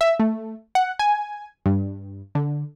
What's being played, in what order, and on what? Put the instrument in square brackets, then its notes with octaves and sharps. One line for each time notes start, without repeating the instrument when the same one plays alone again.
[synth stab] E5
A3
F#5
G#5
G2
D3